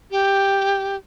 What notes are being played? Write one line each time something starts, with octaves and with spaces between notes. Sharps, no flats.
G4